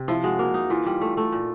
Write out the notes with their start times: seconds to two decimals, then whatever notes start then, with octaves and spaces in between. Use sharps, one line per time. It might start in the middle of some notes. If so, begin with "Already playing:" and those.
Already playing: C3
0.08 F3 E4
0.23 G#3 F#4
0.39 A#3 F#4
0.54 D#4
0.70 E3 F4
0.86 G3
1.01 A3
1.17 A3
1.32 A#2